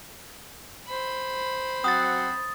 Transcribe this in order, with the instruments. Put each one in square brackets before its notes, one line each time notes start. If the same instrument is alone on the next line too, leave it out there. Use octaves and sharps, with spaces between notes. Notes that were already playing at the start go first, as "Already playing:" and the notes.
[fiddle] C5 B5
[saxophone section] F#3 C4 F#5 [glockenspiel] D#6 A6